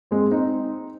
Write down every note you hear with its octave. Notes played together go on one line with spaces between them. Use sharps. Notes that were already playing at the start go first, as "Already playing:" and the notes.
G#3 C4
C4 D#4